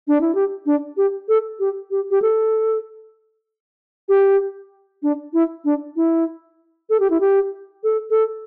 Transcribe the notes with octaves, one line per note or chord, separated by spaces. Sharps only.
D4
E4
G4
D4
G4
A4
G4
G4
G4
A4
G4
D4
E4
D4
E4
A4
G4
E4
G4
A4
A4